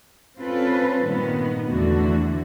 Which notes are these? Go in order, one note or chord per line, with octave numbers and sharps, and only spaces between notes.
C4 C#4 F4 A4 B4
G2 A#2 D#3 B3
E2 D3 A3 F#4